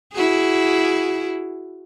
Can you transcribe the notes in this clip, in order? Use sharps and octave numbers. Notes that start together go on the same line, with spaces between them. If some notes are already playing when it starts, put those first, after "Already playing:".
E4 F#4 G#4